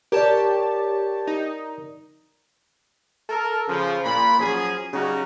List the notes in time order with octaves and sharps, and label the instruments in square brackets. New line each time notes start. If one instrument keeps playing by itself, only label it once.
[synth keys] G4 C#5 A5 [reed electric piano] A#4 D5
[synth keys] D#4
[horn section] A4 A#4
C#3 F3
A#2 B5
F3 F#3 C#4 G#4
C#3 F#3 G3 C#4 D#4 F#4